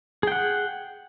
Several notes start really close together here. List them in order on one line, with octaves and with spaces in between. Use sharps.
G#4 G5 F#5